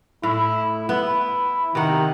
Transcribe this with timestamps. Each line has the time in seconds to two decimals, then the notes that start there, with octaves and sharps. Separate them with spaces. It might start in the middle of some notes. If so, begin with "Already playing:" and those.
0.23 A2 E4
0.89 B3 E4
1.75 C3 D#3 F#5